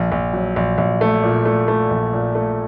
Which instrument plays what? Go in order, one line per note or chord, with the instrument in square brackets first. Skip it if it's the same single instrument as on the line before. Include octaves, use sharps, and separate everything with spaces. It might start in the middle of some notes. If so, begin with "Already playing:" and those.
Already playing: [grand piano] A#1
A#1
F#3
A#1
A#1
A3
A#2
A3
A3
A#1
A#2
A3